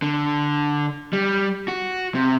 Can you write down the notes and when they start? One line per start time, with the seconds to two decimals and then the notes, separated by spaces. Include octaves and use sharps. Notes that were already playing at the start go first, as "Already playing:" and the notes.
0.02 D3
1.13 G3
1.68 F#4
2.15 C3